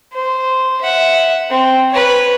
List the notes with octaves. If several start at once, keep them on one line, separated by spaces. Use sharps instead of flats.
C5
E5 F#5
C4
B4 C#5